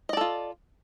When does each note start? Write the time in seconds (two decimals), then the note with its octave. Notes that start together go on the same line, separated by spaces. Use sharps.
0.09 D#5
0.13 D5
0.17 A4
0.21 F4